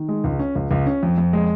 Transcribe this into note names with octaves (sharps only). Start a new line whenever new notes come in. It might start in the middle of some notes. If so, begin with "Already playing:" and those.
Already playing: D#3
G#3
C#2
C#4
C#2
C#2
C#4
F2
F2
G#3